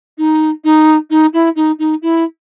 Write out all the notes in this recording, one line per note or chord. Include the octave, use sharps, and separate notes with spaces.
D#4
D#4
D#4
E4
D#4
D#4
E4